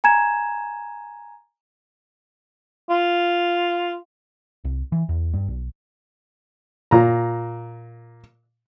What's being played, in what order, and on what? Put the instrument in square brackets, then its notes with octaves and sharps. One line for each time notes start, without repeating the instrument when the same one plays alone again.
[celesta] G#5 A#5 G#6 E7
[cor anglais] F4
[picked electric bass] C2
E3
E2
G2
B1
[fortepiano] A#2 A#5